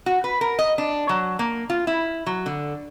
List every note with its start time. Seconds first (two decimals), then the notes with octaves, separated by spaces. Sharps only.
0.06 F#4
0.24 B4
0.41 A#4
0.59 D#5
0.78 D4
1.09 F#3
1.39 A#3
1.70 F4
1.87 E4
2.26 F#3
2.46 D3